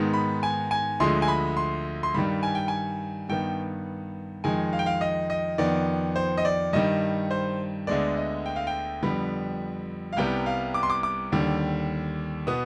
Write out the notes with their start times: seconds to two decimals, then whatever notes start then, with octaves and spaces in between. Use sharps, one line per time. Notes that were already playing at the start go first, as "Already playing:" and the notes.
Already playing: G#2 D#3 G#3 B3
0.13 B5
0.43 G#5
0.71 G#5
1.00 D2 D3 F3 G#3 C6
1.22 G#5
1.28 B5
1.57 C6
2.03 C6
2.14 G2 D#3 G3 B5
2.43 G#5
2.55 G5
2.68 G#5
3.29 G2 D#3 B3 G5
4.44 F2 D#3 G#3 G#5
4.73 F5
4.79 G5
4.86 F5
5.01 D#5
5.30 D#5
5.58 F2 D#3 B3 D5
6.16 C5
6.38 D#5
6.45 D5
6.73 G2 D#3 G3 D#5
7.31 C5
7.87 D2 D3 G#3 B3 D5
8.17 D#5
8.46 G5
8.56 F5
8.67 G5
9.03 F2 D3 G3 B3 B5
10.13 F5
10.17 C2 C3 G3 B3 G5
10.46 F5
10.74 D6
10.83 C6
10.90 D6
11.03 D6
11.32 D#2 D3 G3
12.47 B2 B3 D#6